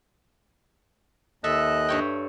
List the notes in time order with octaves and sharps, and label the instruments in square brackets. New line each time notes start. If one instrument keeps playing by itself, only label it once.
[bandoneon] D#2 D#5 F#6 [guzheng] A4 E5
[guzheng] G2 C#5 G5